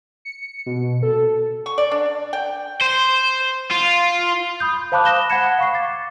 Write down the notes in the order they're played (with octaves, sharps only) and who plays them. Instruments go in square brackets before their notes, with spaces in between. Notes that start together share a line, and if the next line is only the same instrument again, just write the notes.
[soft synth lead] C#7
B2
A4
[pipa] C#6
D5
D4
G5
[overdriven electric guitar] C5
F4
[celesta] B5 D#6 G6
C5 F5 A5 B5 D6 F#6
D#6 F#6 A#6 E7 G7
F#5 B5 F#6 G#6 C#7 E7
F5 C#6 C7
D6 A6